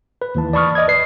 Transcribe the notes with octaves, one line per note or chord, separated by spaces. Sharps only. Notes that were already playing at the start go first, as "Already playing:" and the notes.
B4
D#2 E3 A5
D5 A5 B5 C#6 D#6 F6
D5 D#5 D#6 G#6
B4 C7